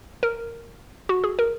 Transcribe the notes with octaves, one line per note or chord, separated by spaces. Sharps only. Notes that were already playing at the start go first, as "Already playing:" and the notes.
A#4
F#4
G#4
A#4